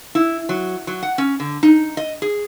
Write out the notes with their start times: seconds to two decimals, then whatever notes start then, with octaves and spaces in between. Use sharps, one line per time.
0.15 E4
0.49 F#3
0.87 F#3
1.03 F#5
1.18 C#4
1.40 D3
1.63 D#4
1.97 D#5
2.22 G#4